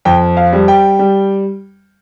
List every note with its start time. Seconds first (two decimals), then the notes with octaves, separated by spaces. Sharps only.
0.05 F2 G5
0.37 F5
0.53 G3
0.68 G5
0.99 G3